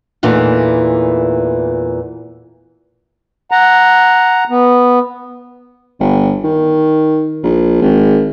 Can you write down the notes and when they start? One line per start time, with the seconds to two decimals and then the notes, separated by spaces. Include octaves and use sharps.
0.23 E2 A#2 E3 A3 D#4
3.51 F#5 A#5
4.50 B3
5.99 G1
6.44 D#3
7.43 A#1
7.81 G#1